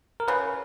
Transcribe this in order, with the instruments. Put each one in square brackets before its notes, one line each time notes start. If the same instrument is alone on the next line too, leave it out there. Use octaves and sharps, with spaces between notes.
[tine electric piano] A#4
[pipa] C#3 [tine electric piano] B4